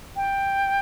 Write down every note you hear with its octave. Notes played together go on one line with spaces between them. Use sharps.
G5